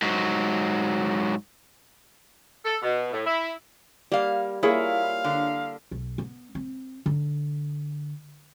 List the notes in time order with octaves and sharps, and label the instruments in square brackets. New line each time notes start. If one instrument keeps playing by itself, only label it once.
[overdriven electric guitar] G#2 F#3
[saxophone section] A4
B2
A2
E4
[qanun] G3 [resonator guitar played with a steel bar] A#3 F5
[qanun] A#3 [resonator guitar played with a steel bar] E4 [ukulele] F4 G#4 C#5 [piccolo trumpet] F5
[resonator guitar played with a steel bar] D3
[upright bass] B1
B3
C4
D3